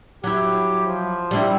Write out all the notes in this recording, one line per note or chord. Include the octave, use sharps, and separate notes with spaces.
F#3 E4 G4
F3
G3 D4 E4